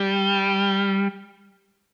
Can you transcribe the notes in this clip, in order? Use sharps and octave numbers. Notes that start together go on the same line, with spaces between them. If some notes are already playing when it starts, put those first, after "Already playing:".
Already playing: G3